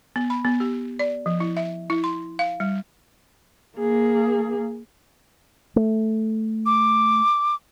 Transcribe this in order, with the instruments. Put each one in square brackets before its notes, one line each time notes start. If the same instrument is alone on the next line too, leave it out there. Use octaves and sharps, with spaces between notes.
[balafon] B3
B5
B3
G4
D5
F3
E4
E5
E4
C6
F5
G3
[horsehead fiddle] A#3 G#4
[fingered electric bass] A3
[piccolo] D6